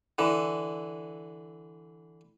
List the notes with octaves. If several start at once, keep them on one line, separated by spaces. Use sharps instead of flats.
D3 E3